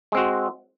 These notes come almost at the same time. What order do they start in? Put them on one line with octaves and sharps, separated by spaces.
G#3 C4 F#4